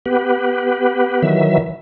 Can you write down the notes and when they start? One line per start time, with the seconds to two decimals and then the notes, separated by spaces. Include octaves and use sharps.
0.06 B3 G4 B4
1.22 D#3 E3 F#3 E5